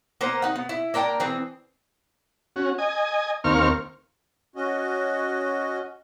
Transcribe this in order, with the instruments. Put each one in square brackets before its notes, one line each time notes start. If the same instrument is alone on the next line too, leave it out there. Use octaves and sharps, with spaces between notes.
[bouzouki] A#3 B3 A#4 C5
D#4 F#5
B3
E4
A#3 D4 A#4 G5
E3 C4 G#4
[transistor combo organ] C#4 F#4
D#5 G#5
D#2 C4 A#4 F5 C#6 F6
[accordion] C#4 F#4 D#5